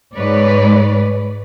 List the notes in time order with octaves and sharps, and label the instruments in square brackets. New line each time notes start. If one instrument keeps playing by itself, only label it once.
[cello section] G#2 G#3 B4 C#5 D5